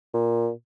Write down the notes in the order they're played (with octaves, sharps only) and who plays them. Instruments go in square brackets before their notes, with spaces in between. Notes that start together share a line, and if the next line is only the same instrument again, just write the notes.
[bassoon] A#2